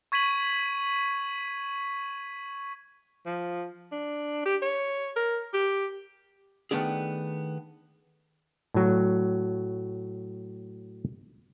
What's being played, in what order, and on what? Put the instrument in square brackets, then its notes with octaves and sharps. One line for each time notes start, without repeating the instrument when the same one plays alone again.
[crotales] C#6 G#6 B6 D#7 F#7
[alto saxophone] F3
D4
G4
C#5
A#4
G4
[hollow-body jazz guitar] D#3 F#3 A3 B3 D4 G#4
[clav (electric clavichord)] A2 F#3